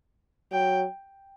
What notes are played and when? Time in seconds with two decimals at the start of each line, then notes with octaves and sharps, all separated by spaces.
0.52 F#3 G5